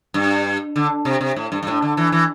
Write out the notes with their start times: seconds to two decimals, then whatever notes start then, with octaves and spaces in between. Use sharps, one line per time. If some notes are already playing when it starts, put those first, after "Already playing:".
0.14 G2
0.76 D3
1.05 C3
1.21 C3
1.36 A2
1.52 G2
1.63 G2
1.67 A2
1.82 D3
1.97 E3
2.12 E3